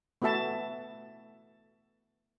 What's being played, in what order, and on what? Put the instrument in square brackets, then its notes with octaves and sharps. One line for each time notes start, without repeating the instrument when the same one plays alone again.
[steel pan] A3 B3 F#4 E5 A5